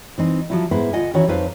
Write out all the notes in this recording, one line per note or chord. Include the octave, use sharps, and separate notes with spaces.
E3 C4 D#4
F3 F#3 E4
G#2 B3 E4 B4 C5
D2 F4 D#5 F#5 G#5
D#3 E3 C#4 E4 F#4 C#5
F2 F#3 D#4 B4 C5 F5